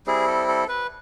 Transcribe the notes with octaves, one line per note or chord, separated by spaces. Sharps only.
G3 C4 E4 G#4
A4
A4
B4